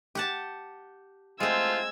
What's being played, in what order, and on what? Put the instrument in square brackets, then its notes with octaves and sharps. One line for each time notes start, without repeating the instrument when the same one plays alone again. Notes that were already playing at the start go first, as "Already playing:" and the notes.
[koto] G4 F#5 A5
[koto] G#3 C4 [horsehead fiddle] A3 C5 [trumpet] F4 [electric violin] E6 G#6